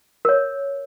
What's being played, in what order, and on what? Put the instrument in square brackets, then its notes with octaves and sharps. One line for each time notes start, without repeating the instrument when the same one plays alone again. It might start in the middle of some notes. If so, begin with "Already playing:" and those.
[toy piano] A#4 C#5